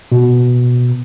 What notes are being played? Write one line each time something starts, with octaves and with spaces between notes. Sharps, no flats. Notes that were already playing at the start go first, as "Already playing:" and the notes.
B2